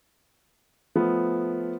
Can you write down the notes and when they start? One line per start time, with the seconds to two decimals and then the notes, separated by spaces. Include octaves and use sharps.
0.95 F3 A3 B3